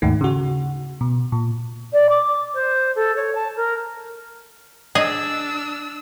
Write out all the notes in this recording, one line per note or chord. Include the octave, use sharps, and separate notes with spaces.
D#2 G#2 D#3 A3
C#3 F#4
B2
A#2
D5
D6
C5
A4
C#5
A5
A#4
D4 G#4 D#5 E6